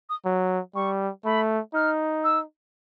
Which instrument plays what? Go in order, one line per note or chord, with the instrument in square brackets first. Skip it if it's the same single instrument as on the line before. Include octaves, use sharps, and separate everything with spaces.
[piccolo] D#6
[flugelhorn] F#3
[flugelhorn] G3 [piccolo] C#6
[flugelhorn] A3 [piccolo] B5
[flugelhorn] D#4 [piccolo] F6
[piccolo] E6